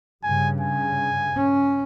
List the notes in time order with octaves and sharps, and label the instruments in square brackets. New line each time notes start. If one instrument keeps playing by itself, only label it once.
[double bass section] G2 C#3 [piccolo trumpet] G#5
[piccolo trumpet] G#5
[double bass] C#4